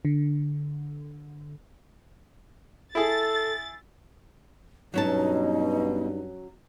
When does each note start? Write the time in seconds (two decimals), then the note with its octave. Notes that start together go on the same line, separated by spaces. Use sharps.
0.05 D3
2.95 E4 G#4 A4 A6
4.94 G2 B2 F#3 C#4 D#4 A5